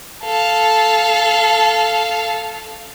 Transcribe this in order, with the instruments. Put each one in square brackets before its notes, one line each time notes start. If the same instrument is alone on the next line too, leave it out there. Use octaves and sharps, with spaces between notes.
[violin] A4 F5